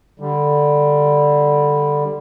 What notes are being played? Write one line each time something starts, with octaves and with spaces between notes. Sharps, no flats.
D3 G3